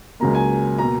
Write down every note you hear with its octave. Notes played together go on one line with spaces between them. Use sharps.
C#2 C#3 F#3 A#3 A#5
G#5
B2 A#3 A#5